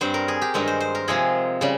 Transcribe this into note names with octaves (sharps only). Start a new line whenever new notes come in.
G2 G3 C4 C5
A#4
G#4
G4
G2 D#3 G#3 C4 D#4 A#4
C5
C5
A#4
C3 F3 G#3 C4 G#4
C#3 G3